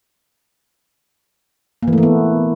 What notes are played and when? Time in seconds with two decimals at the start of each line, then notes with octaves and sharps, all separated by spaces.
1.83 A#3
1.88 E3
1.93 A3
1.98 E3
2.03 B3